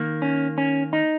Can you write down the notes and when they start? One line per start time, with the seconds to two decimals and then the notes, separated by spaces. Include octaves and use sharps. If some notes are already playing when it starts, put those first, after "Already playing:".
Already playing: D#3 A#3
0.22 C#4
0.58 C#4
0.93 D#4